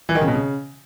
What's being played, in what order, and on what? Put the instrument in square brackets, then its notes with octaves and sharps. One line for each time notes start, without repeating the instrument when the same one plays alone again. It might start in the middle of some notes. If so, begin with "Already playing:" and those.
[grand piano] E3
D#3
C#3
B2
C#3